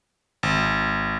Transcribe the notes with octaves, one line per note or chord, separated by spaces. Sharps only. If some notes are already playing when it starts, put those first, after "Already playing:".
G#1